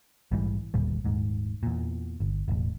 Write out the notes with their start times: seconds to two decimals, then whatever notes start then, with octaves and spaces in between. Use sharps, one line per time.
0.31 A#1 G#2 E3 G3
0.74 G1 D#2 A#2 G3
1.04 D#1 G#2
1.63 E2 A#2
2.20 G1
2.48 E1 A1